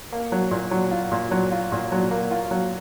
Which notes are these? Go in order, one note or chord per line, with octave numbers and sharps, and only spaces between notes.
A#3
F#3
A#2
F#3
F4
A#2
F#3
F4
A#2
F#3
A#3
F4
F#3